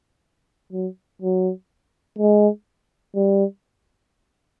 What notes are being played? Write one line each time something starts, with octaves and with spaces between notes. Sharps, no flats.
F#3
F#3
G#3
G3